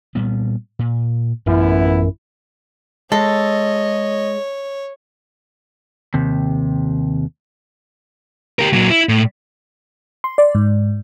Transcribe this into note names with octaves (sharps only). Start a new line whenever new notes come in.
A#2 G3 B3
A#2
A1 F#2 A#2 B3 E4
G#3 A4 C#5 D#5
D#2 C3
G4 A#4
A#2 F#3
E4
A2
C6
D5
G#2